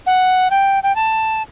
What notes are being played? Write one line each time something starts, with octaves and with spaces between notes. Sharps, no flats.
F#5
G5
G5
A5